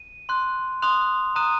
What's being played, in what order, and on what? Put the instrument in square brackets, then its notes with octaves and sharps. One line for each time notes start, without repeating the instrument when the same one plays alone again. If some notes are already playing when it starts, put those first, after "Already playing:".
Already playing: [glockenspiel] D#7
C6 F#6
C6 D#6 F#6 F7
A#5 D#6 F#6 D#7